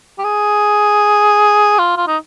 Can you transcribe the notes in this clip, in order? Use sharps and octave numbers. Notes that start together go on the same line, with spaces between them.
G4
G#4
F4
F4
D#4